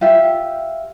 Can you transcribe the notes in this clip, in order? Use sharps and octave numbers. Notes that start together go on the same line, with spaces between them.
F4 G4 E5